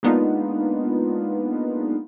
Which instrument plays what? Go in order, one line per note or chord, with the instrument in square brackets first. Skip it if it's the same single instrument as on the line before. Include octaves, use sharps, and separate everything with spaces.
[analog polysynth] G#3 A#3 B3 D4 D#4 F4